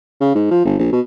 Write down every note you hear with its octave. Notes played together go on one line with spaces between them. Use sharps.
C#3
G#2
F3
G1
A#1
B2